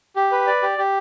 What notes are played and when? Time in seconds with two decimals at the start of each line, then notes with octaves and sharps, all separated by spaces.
0.16 G4
0.32 B4
0.47 D5
0.62 G4
0.78 G4